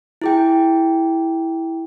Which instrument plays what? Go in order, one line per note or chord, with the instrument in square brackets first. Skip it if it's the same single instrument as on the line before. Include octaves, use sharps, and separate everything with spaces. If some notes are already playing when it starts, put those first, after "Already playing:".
[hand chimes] E4 G#4 G5